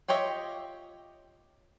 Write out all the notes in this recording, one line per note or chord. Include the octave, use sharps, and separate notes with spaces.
F4 G4 C#5 D#5 E5